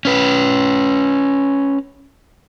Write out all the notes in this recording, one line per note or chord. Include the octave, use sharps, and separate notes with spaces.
C#4 B4